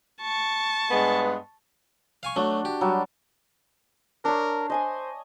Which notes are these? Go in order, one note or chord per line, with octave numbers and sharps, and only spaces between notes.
A5 C#6
G2 G#3 B3
F5 G#5 C#6
F#3 A3 D4 F#4
G4
F#3 G3
D4 A#4 C#5
C5 D#5 G#5 D#6